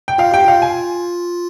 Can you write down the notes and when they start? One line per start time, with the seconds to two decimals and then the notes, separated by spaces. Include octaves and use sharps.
0.08 G5
0.18 F4 F5
0.31 G4 G5
0.44 F4 F5
0.62 G#5